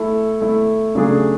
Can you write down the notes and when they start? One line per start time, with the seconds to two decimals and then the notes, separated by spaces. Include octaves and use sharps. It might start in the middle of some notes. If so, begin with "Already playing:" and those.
Already playing: A3 E4 A4
0.41 A3 E4 A4
0.95 C#3 F#3 A3 D4 G#4